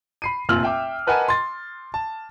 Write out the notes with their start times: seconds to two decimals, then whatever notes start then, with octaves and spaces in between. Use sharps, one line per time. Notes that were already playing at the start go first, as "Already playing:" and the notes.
0.22 B5 C7 D#7
0.49 F1 A#2 F4 E6 F6 F#7
0.63 E5 G5 D6
1.07 A#4 B4 D#5 F#5 G#5 A5
1.28 C6 A6
1.94 A5